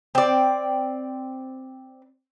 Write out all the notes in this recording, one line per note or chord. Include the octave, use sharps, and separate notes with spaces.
C4 D5